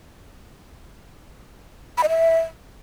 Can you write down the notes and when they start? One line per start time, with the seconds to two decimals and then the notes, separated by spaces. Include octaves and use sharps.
1.98 B5
2.03 D#5
2.09 E5